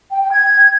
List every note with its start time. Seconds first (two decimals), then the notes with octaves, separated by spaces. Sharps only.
0.11 G5
0.22 G5
0.32 G#6